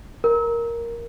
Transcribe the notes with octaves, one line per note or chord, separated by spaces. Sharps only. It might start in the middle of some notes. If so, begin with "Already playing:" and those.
A#4